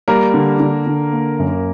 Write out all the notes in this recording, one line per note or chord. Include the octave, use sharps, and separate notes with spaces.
G3 A#3 A#4
D3
D3
D3
A#3
F#2